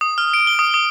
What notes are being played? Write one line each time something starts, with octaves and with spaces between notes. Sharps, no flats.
D#6
F6
D7
G7
D#6
D#6